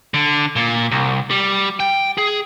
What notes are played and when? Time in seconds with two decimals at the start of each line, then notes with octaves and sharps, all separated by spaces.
0.14 D3
0.56 A#2
0.91 C2
1.30 G3
1.80 G5
2.18 G#4